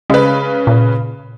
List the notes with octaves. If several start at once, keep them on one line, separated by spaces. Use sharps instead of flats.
C#3 G#3 B4
A#2